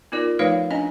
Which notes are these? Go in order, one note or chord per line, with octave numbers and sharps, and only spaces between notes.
B3 D#4 F4 A#4 D5
F3 A3 D#4 B4 C#5 F5
C#4 D4 D#5 G#5